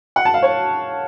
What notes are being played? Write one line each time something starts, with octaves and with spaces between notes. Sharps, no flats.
F#5
A5
F5
C#5